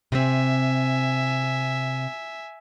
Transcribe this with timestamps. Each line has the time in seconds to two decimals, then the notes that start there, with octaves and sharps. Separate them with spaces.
0.12 C3 C4 E5 G#5